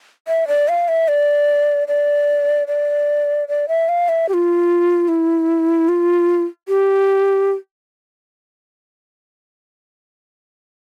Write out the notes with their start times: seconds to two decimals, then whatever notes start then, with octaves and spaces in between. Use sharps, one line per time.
0.28 E5
0.48 D5
0.68 F5
0.88 E5
1.08 D5
1.88 D5
2.68 D5
3.48 D5
3.68 E5
3.89 F5
4.09 E5
4.29 G4
4.34 F4
5.08 E4
5.89 F4
6.69 G4